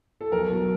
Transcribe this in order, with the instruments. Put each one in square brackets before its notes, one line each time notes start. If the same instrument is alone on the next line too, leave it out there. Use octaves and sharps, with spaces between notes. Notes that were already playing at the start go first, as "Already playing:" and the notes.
[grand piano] A4
B1 A#4
B2 F#3